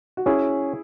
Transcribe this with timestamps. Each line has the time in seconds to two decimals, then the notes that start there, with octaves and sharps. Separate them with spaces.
0.17 F#4
0.26 C#4 E4 G#4